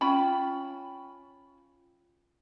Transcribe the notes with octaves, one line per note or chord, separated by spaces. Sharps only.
C#4 F4 G5 B5